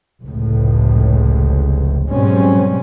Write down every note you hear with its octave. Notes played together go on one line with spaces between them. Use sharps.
F1 C#2 A2
G#2 B2 F#3 G3 C4 C#4